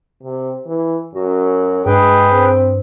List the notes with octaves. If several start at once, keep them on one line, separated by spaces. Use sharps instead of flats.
C3
E3
F#2 F#4
G2 G#3 G#4 B4 G5
C4